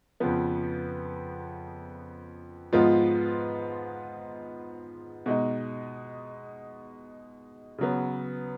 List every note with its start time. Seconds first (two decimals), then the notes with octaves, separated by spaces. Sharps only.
0.20 F2 C#3 F3 B3
2.73 G#2 F3 G#3 B3 F4
5.26 B2 G#3 D#4
7.78 C#3 F#3 B3